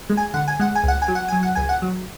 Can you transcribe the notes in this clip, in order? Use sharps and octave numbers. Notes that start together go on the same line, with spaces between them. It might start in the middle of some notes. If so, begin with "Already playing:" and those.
G#3
G#5
D3 F#5
G#5
G#3 F#5
G#5
C#2 F#5
G#5
F#3
F#5
F#3 G#5
F#5
C#2 G#5
F#5
F#3